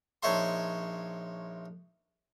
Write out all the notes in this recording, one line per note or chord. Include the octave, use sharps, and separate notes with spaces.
A#1 D#4 C#5 E5 A5 C6